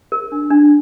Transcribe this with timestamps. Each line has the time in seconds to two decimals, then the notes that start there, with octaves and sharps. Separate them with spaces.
0.12 A#4
0.32 D4
0.50 D4